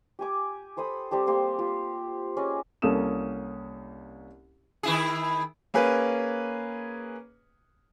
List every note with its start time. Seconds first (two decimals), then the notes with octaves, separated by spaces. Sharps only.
0.19 G4 G#5 D6
0.77 A4 C5 B5 D#6
1.11 G3 C4 G4 A5
1.27 A#3 G4 C5 A5
1.59 F4 G4
2.37 C#4 G#4 D5 D#5
2.82 C2 A#3 C#4 A4 D#6 E7
4.83 D#3 E4 G#4
5.74 A#3 C#4 G#4 B4